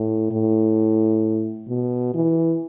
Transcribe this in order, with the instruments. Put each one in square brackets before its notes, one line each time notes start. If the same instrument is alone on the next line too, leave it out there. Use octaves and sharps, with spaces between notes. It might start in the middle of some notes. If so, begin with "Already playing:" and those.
Already playing: [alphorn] A2
A2
B2
E3